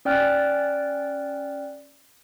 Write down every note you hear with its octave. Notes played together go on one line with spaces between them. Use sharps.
C#4 D5 G5 F6 F#6